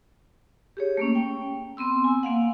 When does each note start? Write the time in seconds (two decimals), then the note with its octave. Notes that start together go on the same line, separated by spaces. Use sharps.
0.77 G4 G#4 C#5
0.97 A3 A#3 C#4
1.15 G5
1.77 B3 C4 C6 E6
2.04 G#5
2.23 A#3 F5 F#5